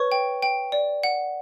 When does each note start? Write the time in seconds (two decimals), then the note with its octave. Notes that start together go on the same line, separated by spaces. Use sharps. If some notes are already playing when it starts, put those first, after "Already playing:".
Already playing: B4 C#5 C#6
0.12 G5
0.43 G5
0.72 D5
1.04 F#5